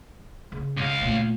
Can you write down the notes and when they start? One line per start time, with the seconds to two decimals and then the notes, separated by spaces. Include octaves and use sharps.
0.52 C#3
0.77 C#2 F5
1.01 A#2 A3